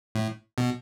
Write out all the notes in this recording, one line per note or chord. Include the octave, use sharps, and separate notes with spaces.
A2
B2